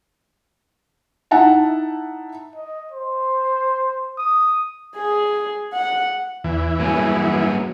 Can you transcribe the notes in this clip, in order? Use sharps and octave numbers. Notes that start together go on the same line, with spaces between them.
D#4 E4 E5 F#5 A5 A#5
D#5
C5
D#6
G#4
F#5
E2 E3
G2 F#3 A#3 B3 G#4